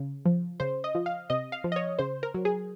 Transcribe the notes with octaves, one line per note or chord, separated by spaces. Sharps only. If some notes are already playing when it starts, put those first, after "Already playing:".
Already playing: C#3
F3
C#3 C5
D#5
F3
F5
C3 D#5
F5
F3
D#5
C#5
C#3 C5
A#4
F#3
G#4